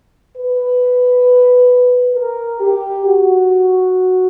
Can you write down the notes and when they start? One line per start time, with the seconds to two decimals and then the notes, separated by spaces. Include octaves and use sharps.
0.37 B4
2.15 A#4
2.61 G4
3.06 F#4